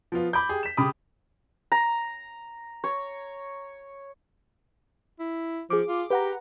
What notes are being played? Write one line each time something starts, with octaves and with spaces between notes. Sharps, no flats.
F3 B3 F4
B5 D6 G6
G4 G#4
B6 E7
C#3 G4 B5 D6 D#6
A#5
C#5
E4
F3 G#4 D6
F4
G4 B4 F#5 A#5